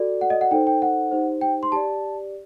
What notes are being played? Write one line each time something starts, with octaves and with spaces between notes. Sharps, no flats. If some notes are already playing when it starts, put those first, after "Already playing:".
Already playing: F#4 A4 D5
F#5
D#5
F#5
D#4 A4 C5 G5
G5
F#5
D#4 G4 C5
G5
C6
G4 D5 A5